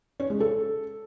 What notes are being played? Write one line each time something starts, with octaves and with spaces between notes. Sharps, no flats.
C#4
G#3
A4